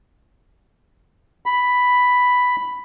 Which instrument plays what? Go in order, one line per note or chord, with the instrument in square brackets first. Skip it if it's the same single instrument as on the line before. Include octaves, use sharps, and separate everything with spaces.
[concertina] B5